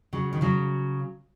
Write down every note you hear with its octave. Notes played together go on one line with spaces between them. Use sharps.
C#3 F#3
D#3
C#3 F#3